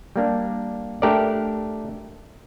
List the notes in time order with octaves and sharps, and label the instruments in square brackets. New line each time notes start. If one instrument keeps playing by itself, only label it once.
[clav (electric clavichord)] G3 A#3 D4
A3 D4 G4 A#4 D5